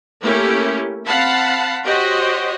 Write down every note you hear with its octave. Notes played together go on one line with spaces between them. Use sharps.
A3 A#3 C#4 E4 G4
C4 F5 F#5 A5 B5
F#4 G4 C5 C#5 D#5